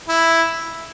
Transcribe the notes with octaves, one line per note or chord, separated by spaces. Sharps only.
E4